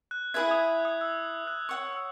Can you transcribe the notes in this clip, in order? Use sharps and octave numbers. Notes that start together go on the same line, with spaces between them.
F#6
E4 G#4 B4 E5 G#6
D#6
D#6
E6
F#6
C#5 F#5 C#6 E6
E6